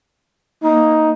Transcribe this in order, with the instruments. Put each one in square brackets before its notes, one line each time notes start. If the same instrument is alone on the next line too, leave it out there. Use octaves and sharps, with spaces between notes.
[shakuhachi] A#3 [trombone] D#4